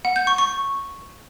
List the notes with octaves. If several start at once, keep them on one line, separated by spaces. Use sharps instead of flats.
F#5
G6
C#6
C#6